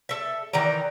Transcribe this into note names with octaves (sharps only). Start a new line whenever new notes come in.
A4 E5
D#3 E3 D5 A#5